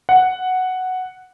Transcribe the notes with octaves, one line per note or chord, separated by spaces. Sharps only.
F#5